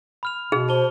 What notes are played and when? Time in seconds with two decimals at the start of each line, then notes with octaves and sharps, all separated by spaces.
0.23 B5 F6 F7
0.52 B2 G#4
0.69 C5 A5 G7